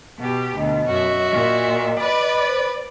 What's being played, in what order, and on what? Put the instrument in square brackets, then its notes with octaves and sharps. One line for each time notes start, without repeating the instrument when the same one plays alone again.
[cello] B2 G4
[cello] D2 B2 [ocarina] D#5
[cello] F#2 [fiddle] F#4 E5
[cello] A#2
[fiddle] B4 B5 [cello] D5
[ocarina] C5